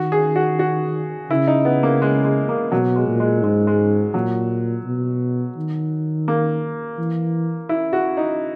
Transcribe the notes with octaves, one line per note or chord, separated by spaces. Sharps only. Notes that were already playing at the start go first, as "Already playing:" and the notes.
Already playing: D#3 F#4
G#4
F#4
F#4
C#3 E4
D#4
B3
A#3
G#3
G#3
A#3
B2 F#3
G#3
A#2
G#3
G#2 G#3
G#3
A#2 F#3
B2
D#3
A#3
E3
E4
F#4
D#4